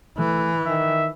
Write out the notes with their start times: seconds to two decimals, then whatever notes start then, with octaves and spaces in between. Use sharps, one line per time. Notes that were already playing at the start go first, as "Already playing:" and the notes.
0.18 E3 A3
0.66 D#3 E5